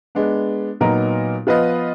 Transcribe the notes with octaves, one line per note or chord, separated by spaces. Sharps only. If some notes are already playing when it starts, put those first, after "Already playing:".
G#3 B3 D4
A#2 F#3 B3 D#4 A#4
F3 B3 F4 B4 D#5